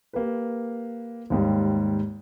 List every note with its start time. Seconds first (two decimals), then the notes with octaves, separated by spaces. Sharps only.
0.13 A#3 G4 A#4 B4
1.30 D#2 G#2 G3